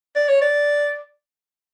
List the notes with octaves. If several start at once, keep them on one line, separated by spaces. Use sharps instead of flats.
D5
C#5
D5